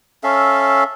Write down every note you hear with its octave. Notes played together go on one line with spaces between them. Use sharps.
C#4 A4 E5 F5